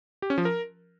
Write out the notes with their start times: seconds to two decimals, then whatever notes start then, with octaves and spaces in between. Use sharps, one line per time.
0.22 G4
0.30 C#4
0.38 F3
0.45 A#4